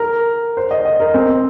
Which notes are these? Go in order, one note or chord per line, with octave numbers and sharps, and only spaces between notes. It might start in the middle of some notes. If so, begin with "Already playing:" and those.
Already playing: A#4
C5
D#5
D#5
A#4
C4